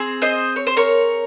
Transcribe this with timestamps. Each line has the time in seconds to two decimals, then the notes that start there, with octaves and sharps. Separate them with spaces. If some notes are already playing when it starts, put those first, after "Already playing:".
Already playing: C4 G#4
0.22 C5 D#5
0.56 C#5
0.67 C5
0.77 A#4 C#5